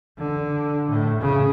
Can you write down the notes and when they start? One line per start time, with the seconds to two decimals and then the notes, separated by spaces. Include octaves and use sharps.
0.18 D3
0.90 A2
1.21 C#3